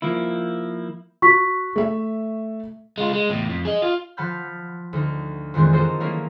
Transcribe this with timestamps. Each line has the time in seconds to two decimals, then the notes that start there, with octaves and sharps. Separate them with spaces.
0.02 F3 A#3 E4
1.22 F#4 C#6 B6
1.76 A3 E5
2.98 G#3 F4
3.13 G#3
3.30 E2 A2
3.49 F2
3.65 G#4 D#5
3.82 F4
4.17 F3 F#5 A5 B5 F6 G6
4.93 D2 D#4
5.54 F2 A#2 D#3 E3 G#3 C4
5.72 F4 F#4 A4 A#4 C5 D#5
6.00 F#3 A#3 C#4 E4 A#4 F5